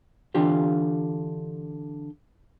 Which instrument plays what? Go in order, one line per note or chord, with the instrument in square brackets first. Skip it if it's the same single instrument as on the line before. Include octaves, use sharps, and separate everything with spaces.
[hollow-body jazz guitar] D3 E3 D4 F4 G4 F5